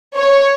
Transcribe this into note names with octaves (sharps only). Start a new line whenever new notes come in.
C#5